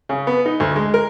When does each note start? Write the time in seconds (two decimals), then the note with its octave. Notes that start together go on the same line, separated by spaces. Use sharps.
0.09 C#3
0.27 B3
0.46 D#4
0.60 D2
0.76 G#3
0.94 A#4